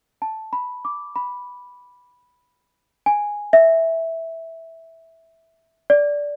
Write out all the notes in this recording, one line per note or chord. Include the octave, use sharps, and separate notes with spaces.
A5
B5
D6
B5
G#5
E5
D5